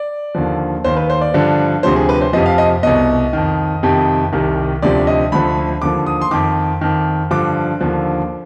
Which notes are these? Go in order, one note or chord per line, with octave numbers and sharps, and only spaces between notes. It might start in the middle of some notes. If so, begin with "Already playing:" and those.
Already playing: D5
D#2 D3 F3
D#2 D#3 C5
B4
C5
D5
G2 D3 F3
D2 C3 F3 C5
G#4
B4
C5
F2 C3 F3 D#5
F5
D#5
C2 B2 D#5
F2 D#3
F2 C3 D#3
C2 C3 D#3
D2 C3 F3 D5
D#5
D2 D3 F3 B5
D#2 D3 F3 D6
D#6
C6
F2 D#3 D6
F2 D#3
G2 D3 F3 D6
D#2 D3 F3